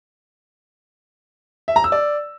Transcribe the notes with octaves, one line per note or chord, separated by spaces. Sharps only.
E5
A#5
E6
D5